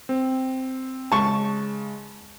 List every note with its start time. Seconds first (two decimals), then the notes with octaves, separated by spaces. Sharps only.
0.09 C4
1.12 C#3 G#3 A5 C#6